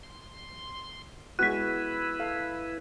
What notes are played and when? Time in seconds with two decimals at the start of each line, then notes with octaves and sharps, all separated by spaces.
0.03 C6
1.39 G#3 B3 E4 F#4 B4 F#6 B6
2.19 A4 F5